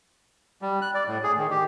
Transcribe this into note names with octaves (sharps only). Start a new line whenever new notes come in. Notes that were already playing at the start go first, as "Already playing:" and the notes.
G3
F#6
D5
A2
G#4
D#3
G4